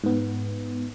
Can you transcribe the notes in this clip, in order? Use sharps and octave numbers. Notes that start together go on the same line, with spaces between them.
G#2 B3